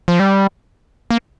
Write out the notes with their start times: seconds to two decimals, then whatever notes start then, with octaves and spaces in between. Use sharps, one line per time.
0.08 F3
0.20 G3
1.11 A#3